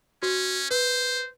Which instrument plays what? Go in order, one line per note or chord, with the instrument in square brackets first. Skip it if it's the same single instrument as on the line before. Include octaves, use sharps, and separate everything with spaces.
[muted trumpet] C#4 [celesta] F#4
[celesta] B4 [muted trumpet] C5